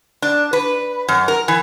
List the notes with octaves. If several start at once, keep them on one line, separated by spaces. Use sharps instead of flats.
D4
B4
F#2
A#4
E3